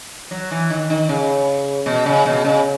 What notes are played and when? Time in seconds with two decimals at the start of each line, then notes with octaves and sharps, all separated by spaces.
0.31 F#3
0.51 E3
0.70 D#3
0.90 D#3
1.09 C#3
1.86 B2
2.06 C#3
2.26 B2
2.45 C#3